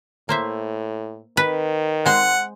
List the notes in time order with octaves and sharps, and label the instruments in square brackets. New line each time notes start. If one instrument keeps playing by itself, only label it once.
[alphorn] A2 [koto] A#3 C5 E5
[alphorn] D#3 [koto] B4
[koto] G#3 C5 [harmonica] F#5